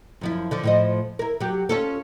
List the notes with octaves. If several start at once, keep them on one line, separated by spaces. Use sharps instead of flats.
F#2 F3 E4
D3 F3
A2 F3 D#5
E4 A#4
F#3 G4
C#4 F4 A4